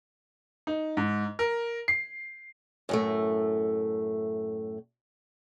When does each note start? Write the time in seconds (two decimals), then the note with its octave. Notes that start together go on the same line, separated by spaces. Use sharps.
0.67 D#4
0.97 G#2
1.39 A#4
1.88 C7
2.89 F#2 A2 A3